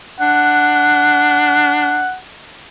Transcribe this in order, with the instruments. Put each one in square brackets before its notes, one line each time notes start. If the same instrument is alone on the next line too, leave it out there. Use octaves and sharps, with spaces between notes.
[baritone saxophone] D4 [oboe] F#5